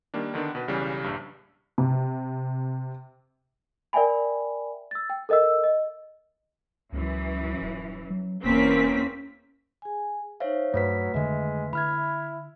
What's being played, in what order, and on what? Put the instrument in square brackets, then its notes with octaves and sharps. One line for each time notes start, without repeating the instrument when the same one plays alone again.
[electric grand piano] D#3 G3 A#3 D4
D3 D#3 B3 D4
B2 B4
B1 C#3 E3 G3
A#1 G2
[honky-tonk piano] C3
[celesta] A#4 D5 E5 G5 G#5 B5
E6 A6
G5
A4 A#4 D#5 E5 E6
D#5
[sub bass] C#2 [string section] F#2 E3
[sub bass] D#1
F#3
[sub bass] E1 [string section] E2 C4 B6 [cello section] A#3 C#4
[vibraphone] G#4 G#5
[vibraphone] D#4 C5 [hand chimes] C#5 E5 F5
[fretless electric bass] G2 [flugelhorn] F#3 [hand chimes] A3 B4 B6
[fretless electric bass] F2 D3 D#3 [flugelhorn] G#3 [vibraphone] E5
[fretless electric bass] D3 [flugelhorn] E4 [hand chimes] B5 F6 G#6